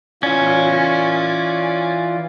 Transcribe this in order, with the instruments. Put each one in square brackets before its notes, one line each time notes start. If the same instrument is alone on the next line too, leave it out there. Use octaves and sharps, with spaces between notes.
[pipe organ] E3 F4 [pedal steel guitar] C#4 [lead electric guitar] D5 F5